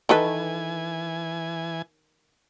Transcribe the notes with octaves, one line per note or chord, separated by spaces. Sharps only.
D#3 E3 A4 B4 G#5